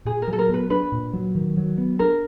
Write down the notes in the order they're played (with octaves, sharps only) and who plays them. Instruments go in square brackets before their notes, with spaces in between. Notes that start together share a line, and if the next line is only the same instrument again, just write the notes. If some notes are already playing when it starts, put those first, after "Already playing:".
[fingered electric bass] A#2 [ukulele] G#4
[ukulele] A#4
[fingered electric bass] F#3
[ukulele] A4
A#4
[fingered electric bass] B3 [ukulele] B4
[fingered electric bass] D4 [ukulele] B4
[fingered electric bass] A#2
F#3
D#3
F#3
B3
[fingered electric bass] D4 [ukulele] A#4